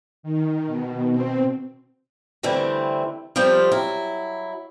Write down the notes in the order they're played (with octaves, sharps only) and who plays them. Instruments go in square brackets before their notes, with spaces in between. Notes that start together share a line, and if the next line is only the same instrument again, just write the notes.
[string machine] D#3
B2
C4
[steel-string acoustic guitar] D3 E3 G3 A3 C4
F3 G3 C4 F4 G4 A4
F#3 E4